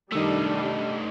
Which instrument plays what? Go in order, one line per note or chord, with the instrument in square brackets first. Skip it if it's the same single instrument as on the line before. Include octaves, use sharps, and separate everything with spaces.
[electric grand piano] D#3 E6 [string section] G3 D4 [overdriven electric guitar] A3 D#4